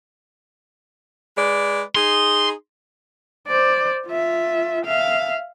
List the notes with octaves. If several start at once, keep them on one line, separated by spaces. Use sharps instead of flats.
G#3 B4 D5
D#4 G#4 C6
C5 D5
F4 E5
E5 F5